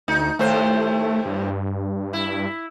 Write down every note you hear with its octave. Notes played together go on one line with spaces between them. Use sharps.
D2 D#4
D#2 A2 A3 C5
G2
E4